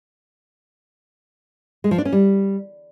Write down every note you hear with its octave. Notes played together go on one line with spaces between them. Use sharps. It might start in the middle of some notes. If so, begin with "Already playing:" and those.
G#3
F3
D4
C#4
G3